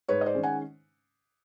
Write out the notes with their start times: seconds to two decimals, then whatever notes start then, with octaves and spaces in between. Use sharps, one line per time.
0.08 G#2 B4 C#5
0.21 D#5
0.26 C5 D5
0.35 D#3 G#3 C#4
0.43 F#5 G#5